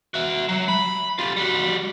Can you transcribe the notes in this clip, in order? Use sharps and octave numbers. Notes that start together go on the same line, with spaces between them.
F#4 E5
F#3
B5
F4 G4
G3 F#4